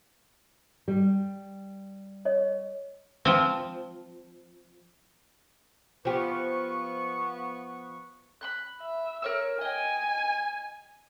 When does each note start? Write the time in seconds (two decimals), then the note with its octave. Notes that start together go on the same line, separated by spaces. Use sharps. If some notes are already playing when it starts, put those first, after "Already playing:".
0.88 G3
2.25 C#5 D#5
3.25 F3 C4
6.05 F3 B3 G4 B4 C#6
8.41 B5 C6 F#6
8.81 E5
9.22 A#4 C#5 E6
9.61 D#5 G5 G#5